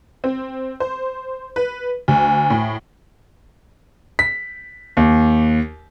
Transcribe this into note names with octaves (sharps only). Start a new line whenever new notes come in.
C4
C5
B4
D2
A2
B6
D#2